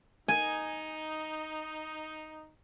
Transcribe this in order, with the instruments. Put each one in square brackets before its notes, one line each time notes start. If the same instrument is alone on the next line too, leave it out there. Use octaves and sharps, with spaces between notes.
[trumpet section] D#4 [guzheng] G#5